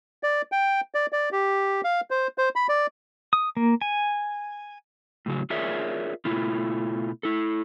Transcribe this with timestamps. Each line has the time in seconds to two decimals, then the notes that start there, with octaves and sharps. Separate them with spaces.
0.23 D5
0.52 G5
0.94 D5
1.12 D5
1.32 G4
1.84 F5
2.11 C5
2.38 C5
2.56 B5
2.69 D5
3.33 D#6
3.57 A#3
3.81 G#5
5.26 A2 C#3 F#3
5.50 F4 G#4 A#4 C#5 D5 E5
6.25 B2 A3 E4 F4
7.23 E4 A4